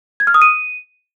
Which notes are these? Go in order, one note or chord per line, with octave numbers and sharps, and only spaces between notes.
G#6
F6
D#6
D#7